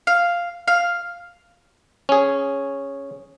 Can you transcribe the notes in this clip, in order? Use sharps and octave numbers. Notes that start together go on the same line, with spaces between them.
F5
F5
C#4 G#4